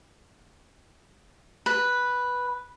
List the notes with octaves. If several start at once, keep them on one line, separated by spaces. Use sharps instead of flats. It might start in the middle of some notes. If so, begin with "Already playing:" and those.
B4